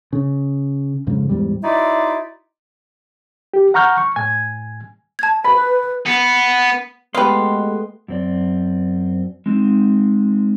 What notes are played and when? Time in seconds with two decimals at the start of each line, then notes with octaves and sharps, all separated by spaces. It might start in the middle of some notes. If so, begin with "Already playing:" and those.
0.13 C#3
1.07 F2 G#2 C#3
1.29 E2 G#2 G3
1.63 D#4 E4 F#4 C5 D5 E5
3.54 G4
3.74 F#5 A#5 C#6 F6 G6
3.98 C#6
4.16 A2 G#5 G#6
5.19 A5 G#6
5.44 B4 B5
6.06 B3
7.15 G#3 A3 B3 G4 B4 F5 C6
8.08 F#2 C4 D5
9.46 G#3 C4 D#4